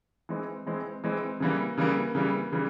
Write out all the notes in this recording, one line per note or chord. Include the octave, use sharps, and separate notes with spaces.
E3 G#3 C4
E3 G#3 C4
E3 G#3 C4
C#3 E3 G3 A#3
C#3 E3 G3 A#3
C#3 E3 G3 A#3
C#3 E3 G3